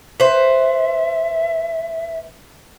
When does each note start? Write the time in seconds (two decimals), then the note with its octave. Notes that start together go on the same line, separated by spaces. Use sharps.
0.20 B4 C5 E5